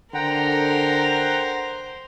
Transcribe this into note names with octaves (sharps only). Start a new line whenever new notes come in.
D3 A#4 C5 F#5 G5 A#5